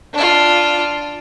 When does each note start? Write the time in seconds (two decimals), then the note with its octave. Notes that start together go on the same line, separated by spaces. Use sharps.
0.14 D4 F4